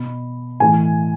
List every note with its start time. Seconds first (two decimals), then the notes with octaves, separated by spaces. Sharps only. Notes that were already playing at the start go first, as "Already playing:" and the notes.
Already playing: B2 B5
0.60 A2 E3 G#5